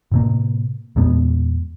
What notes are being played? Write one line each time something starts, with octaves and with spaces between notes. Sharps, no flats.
A2 C3 A#3
E2 A#2 G#3 B3